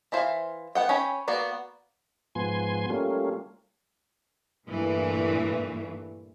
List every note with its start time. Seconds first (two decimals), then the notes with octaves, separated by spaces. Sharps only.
0.12 E3 E4 C5 F5
0.75 B3 F#5 G5
0.89 C#4 C#5 G5 B5
1.28 A#3 B3 F#4 D5
2.35 G#2 F3 B3 G#5 C6
2.90 G3 A3 A#3 C#4 F4
4.68 G2 A#2 E3 A3